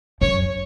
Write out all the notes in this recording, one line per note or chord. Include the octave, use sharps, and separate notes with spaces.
F#2 C#5